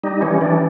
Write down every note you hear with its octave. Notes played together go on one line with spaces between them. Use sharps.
G3 D#4
E3 C#4
E3 D4